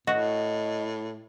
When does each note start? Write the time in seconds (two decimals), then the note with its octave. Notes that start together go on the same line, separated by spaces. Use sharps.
0.07 A2 F#4 D#5